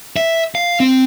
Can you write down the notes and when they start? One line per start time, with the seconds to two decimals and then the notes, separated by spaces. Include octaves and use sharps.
0.16 E5
0.55 F5
0.80 C4